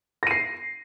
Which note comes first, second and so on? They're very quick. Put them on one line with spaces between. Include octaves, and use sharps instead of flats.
A#6 D#7 C7